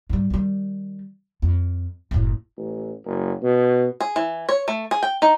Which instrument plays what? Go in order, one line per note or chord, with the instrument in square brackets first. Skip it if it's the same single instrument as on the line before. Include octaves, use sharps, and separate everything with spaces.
[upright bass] G#2 G3
D#3 G3
F2
F#1 A2
[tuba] A1
F#1
B2
[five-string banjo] G#4
E3
C#5
A3
G#4
G5
D#4